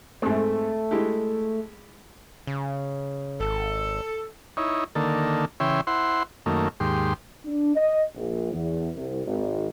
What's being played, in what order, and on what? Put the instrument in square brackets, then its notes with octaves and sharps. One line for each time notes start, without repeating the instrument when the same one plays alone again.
[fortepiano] G#2 C4 [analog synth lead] A3
[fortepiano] G#3 E4 G4
[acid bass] C#3
[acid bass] G#1 [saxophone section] A4
[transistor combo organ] D#4 E4 C#5
D3 D#3 A#3 A4
C#3 E3 C#5 E5 G5 C6
E4 C5 F#5 C6
F#2 D#3 A3 A#3
D#2 G#2 G4 C6
[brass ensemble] D4
D#5
A#1
E2
C2
G#1